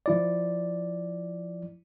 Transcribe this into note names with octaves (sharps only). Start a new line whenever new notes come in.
F3 E4 D5